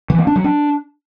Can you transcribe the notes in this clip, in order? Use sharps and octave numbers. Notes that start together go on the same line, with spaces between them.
E3
A#3
D4
F#3
D4